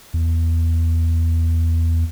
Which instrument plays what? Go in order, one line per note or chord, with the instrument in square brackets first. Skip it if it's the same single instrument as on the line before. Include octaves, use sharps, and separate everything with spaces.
[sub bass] E2